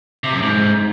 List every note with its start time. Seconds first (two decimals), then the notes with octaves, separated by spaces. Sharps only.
0.24 C3
0.33 F#2
0.42 G#2